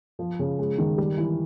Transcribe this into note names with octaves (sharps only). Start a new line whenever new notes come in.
F3
C#3
G#3
D#3
G3
E3